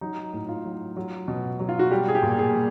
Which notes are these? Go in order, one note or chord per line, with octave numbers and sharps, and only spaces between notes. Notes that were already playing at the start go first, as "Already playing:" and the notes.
F#3 D#4
A2
F4
F#3
F#3
B2
F#3
F4
F#4
G3 G4
G#4
G4
A#2
G#4
G3